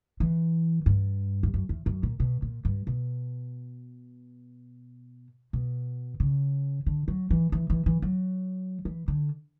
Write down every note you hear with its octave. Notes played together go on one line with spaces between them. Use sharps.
E3
G2
G2
F#2
E2
F#2
A#2
B2
A#2
G2
B2
B2
C#3
D3
F#3
E3
E3
E3
E3
F#3
E3
D3